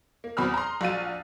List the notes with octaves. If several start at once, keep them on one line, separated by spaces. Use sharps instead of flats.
A#3
E2 C4 F#4 B5 D#6 F6
A#5 C6
A#1 F#4 F5 A6 D#7